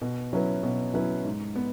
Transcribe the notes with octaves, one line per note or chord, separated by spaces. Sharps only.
B2
F#3 C#4 E4 B4
B2
F#3 C#4 E4 B4
G#2
B3